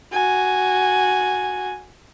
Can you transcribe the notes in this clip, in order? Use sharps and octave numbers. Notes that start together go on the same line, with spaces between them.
F#4 G#5